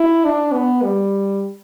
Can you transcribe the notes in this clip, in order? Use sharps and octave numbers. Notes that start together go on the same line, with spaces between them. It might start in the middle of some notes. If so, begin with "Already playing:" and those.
Already playing: E4
D4
B3
G3